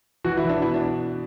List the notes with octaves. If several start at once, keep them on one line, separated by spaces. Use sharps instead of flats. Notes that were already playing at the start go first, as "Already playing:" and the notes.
E3 F#4
E4
E3
D4
B2 E4
D4